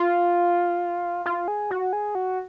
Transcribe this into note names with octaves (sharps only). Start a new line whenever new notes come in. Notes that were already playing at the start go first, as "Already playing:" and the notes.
Already playing: F4
F4
G#4
F#4
G#4
F#4